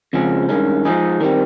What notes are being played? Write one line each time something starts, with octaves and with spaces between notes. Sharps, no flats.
F2 C#3 F3 G#3 C#4
G2 D#3 G#3 C#4
F3 G#3 D#4 G#4
D#3 G3 C4